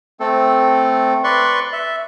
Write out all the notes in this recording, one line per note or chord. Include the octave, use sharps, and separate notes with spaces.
A3 C4 A4
B4 D5 C6 C#6
E5